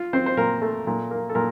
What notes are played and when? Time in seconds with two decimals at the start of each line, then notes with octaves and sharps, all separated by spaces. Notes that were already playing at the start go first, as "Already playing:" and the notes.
Already playing: F4
0.13 C4 C5
0.26 C5
0.37 A#2 A#4
0.62 A3
0.87 A#2
1.11 A#3
1.30 A4
1.35 A#2 A#4